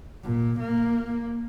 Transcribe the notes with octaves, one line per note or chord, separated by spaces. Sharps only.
A#2
A#3